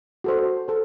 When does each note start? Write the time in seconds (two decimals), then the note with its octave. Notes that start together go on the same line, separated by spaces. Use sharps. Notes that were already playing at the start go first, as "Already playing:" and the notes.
0.24 F#4 A4 C5
0.68 A4 C5